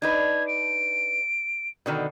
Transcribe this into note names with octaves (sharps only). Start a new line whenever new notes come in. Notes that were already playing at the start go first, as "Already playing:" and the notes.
D4 D#4 B4 G#6
D7
B2 D3 D#3